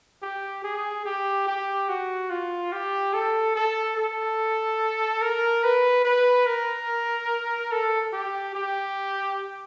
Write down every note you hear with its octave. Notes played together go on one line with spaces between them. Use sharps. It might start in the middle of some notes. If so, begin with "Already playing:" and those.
G4
G#4
G4
G4
F#4
F4
G4
A4
A4
A4
A#4
B4
B4
A#4
A4
G4
G4